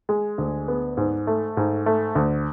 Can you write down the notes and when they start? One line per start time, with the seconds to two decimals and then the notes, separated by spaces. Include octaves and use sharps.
0.09 G#3
0.38 D2
0.68 B3
0.97 G#2
1.27 A3
1.57 G#2
1.86 A3
2.15 D2